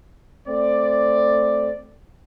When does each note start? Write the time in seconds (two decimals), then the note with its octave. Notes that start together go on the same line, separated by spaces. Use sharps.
0.48 A3 C4 D5